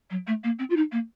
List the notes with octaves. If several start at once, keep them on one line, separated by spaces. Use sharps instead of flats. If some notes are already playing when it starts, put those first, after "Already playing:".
F#3
A3
A#3
C4
F4
D#4
A#3